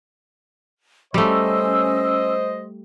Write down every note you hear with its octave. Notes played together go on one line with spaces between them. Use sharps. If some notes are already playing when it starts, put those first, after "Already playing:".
G3 A3 C#4 C5 D#5 E6